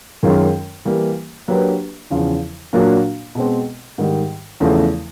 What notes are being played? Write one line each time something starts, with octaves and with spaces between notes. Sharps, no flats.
F#2 D#3 G#3 C#4 F4
E3 G3 A#3
F#3 A#3 D4 G4 B4
E2 C#3 F3
A#2 F#3 A#3 D4 F#4
B2 G#3 C4
G#2 D#3 G3
E2 C#3 F3 A3